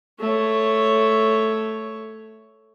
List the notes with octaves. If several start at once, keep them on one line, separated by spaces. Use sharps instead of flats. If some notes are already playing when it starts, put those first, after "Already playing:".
A3 C#5